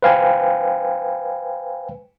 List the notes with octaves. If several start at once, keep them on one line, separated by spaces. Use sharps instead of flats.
B4 C5 F5 G5 G#5